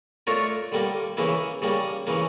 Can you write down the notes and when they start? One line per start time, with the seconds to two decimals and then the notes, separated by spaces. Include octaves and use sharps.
0.27 A3 D4 F4 A#4 C#5
0.72 D3 G3 A#3
1.17 C#3 E3 A#3 E4
1.62 C#3 G3 A#3
2.07 C#3 E3 A#3